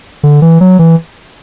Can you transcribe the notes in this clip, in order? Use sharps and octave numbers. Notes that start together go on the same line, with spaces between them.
D3
E3
F#3
E3